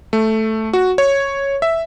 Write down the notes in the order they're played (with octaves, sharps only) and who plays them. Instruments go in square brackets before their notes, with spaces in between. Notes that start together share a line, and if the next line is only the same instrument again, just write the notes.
[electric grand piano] A3
F#4
C#5
E5